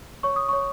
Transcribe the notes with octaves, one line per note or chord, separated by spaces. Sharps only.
C#5 C#6
D#6
C#5 C#6